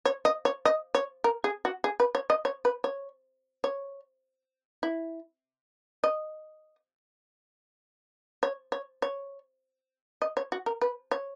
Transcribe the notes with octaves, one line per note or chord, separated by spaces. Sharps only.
C#5
D#5
C#5
D#5
C#5
A#4
G#4
F#4
G#4
B4
C#5
D#5
C#5
B4
C#5
C#5
E4
D#5
C#5
C#5
C#5
D#5
C#5
F#4
A#4
B4
C#5